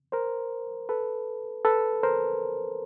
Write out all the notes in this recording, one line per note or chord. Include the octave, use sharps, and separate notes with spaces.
A#4 C5
A4 B4
A4 B4
A#4 C5